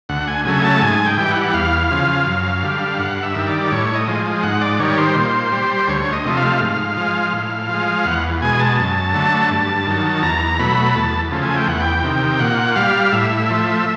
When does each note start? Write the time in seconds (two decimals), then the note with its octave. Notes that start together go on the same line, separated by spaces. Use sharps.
0.09 D2 F#5
0.28 G#5
0.45 C#3 F#3 A3 G#5
0.64 A5
0.82 G#2 G#5
1.06 G5
1.17 E3 G3
1.30 F#5
1.54 E2 F5
1.91 C#3 F3
2.27 F#2
2.63 D3 G3
2.99 G2 F#5
3.23 E5
3.35 D#3 G3
3.47 D5
3.72 A2 C#5
3.95 D#5
4.08 F3 G#3
4.43 G#2 F#5
4.61 D5
4.80 D#3 G3 C#5
4.98 C5
5.16 A#2
5.52 G3
5.88 D2 C#5
6.13 D#5
6.25 C3 F3 A3
6.37 F5
6.61 G#2
6.97 F3 G#3
7.33 A2
7.69 F3 G#3
8.05 E2 F#5
8.42 B2 G#3 G#5
8.60 A5
8.78 F#2
9.14 D3 F#3 A3
9.51 G2
9.86 D#3 F#3
10.22 E2 A#5
10.59 B2 F#3 A3 B5
10.95 E2 A5
11.31 C#3 F3 A3
11.43 G#5
11.56 G5
11.67 E2 F#5
11.80 G5
12.03 C3 D#3
12.40 A#2 F#5
12.76 G3 F5
13.12 A2 E5
13.49 F3 A3